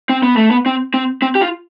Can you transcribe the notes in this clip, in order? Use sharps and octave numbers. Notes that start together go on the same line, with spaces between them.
C4
B3
A3
B3
C4
C4
C4
G4
F4